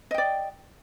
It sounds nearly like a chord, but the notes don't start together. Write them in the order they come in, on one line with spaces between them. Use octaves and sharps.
D#5 G5 D5